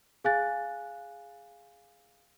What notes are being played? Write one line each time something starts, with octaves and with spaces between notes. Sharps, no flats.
G#4 F5 G#5 F#6 A6